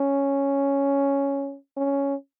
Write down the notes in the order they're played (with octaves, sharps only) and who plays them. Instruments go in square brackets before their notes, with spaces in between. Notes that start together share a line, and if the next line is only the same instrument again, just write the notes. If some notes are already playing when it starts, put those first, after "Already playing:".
Already playing: [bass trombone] C#4
C#4